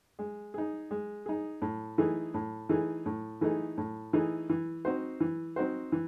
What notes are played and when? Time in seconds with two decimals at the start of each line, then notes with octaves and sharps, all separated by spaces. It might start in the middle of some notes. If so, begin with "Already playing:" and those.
0.19 G#3
0.54 D#4 G#4
0.91 G#3
1.26 D#4 G#4
1.62 A2
1.98 E3 A3 D#4 G#4
2.34 A2
2.69 E3 A3 D#4 G#4
3.06 A2
3.41 E3 A3 D#4 G#4
3.78 A2
4.13 E3 A3 D#4 G#4
4.49 E3
4.85 C4 D#4 F#4 C5
5.20 E3
5.56 C4 D#4 F#4 C5
5.92 E3